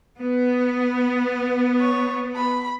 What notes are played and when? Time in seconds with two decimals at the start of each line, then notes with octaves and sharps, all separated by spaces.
0.19 B3
1.80 C#5
2.36 B5